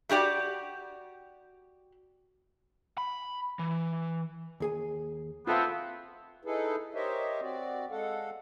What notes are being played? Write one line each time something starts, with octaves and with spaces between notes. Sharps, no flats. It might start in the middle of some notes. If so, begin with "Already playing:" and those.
A3 F#4 G4 D5 G5
B5
E3
D#2 G#4 G#5
A3 B3 C4 F4 A4 F5
D#4 E4 G#4 A4 B4
G4 A#4 C5 C#5 D#5 E5
C4 F#4 D5
G#3 A4 F5 F#5